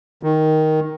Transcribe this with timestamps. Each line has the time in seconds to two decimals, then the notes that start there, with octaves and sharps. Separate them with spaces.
0.23 D#3